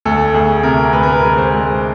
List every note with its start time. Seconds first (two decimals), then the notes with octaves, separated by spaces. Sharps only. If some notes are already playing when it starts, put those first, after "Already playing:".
0.05 D2 A4
0.34 D2 G#4
0.63 C3 A#4
0.93 D2 B4
1.03 A#4
1.12 B4
1.23 G#3
1.38 C5
1.52 G#3